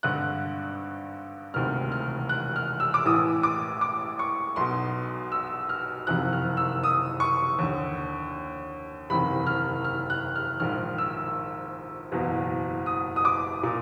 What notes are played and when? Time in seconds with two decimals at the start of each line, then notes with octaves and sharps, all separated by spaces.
0.03 G#1 G2 D3 F#6
1.54 E1 D2 C3 D#3 F6
1.92 F6
2.29 F#6
2.56 F6
2.80 E6
2.94 D6
3.05 A1 A2 E3 D#6
3.43 D6
3.81 D6
4.19 C#6
4.56 B1 B2 C6
5.32 E6
5.69 F6
6.07 F#1 F2 C3 D#3 F#6
6.33 F6
6.57 E6
6.84 D#6
7.20 C#6
7.58 D#2 D3
9.10 F#1 E2 C3 D#3 B5
9.46 F6
9.84 F6
10.10 F#6
10.36 F6
10.60 A#1 G#2 D#3 F6
10.98 E6
12.12 F#1 E2 B2
12.86 D#6
13.16 D#6
13.25 D6
13.63 A#2